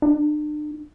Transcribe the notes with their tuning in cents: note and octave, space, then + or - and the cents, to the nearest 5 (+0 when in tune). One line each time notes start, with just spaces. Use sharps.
D4 +40